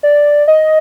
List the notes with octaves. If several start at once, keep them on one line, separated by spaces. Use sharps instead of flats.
D5
D#5